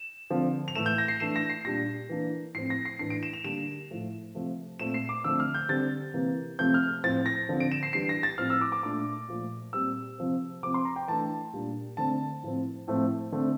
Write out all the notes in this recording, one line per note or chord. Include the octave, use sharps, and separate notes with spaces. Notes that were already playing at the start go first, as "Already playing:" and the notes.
Already playing: E7
D3 F3 C4
F7
A2 E3 A3 E7
G6
A#6
C7
E3 A3 D4 E7
A#6
C7
A#2 G3 D4 A#6
E3 A#3 D4
A2 F3 C4 C7
A#6
C7
A2 E3 A3 D4 C7
D7
E7
F7
D3 G3 A#3 D4 E7
A2 F3 A3
C3 F3 A3
A#2 A3 C4 E7
C7
D6
D3 F3 A3 C4 E6
F6
G6
D3 G3 C4 A6
C3 E3 A#3
C3 F3 A3 C4 G6
F6
A2 F3 C4 A6
A#6
D3 F3 C4
D7
E7
C7
E3 G3 D4 C7
A#6
A6
A2 F3 C4 F6
E6
D6
D6
A#2 A3 D4 D6
A#2 F3 A3
A#2 G3 C4 E6
C3 F3 C4
C3 F3 C4 D6
C6
A#5
G5
E3 A3 D4 A5
A#2 G3 A#3 D4
D3 A3 C4 A5
A2 F3 C4
A2 F3 A3 C4
D3 A3 C4